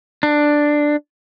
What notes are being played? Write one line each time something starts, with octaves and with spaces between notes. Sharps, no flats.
D4